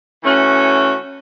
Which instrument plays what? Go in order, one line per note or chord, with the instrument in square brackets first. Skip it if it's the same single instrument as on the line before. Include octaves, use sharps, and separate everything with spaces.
[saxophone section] E3 A3 C#4 F#4